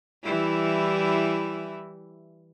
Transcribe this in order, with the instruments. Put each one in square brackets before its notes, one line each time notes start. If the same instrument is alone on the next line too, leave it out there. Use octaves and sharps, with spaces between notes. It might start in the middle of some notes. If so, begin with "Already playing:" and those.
[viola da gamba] E3 G3 E4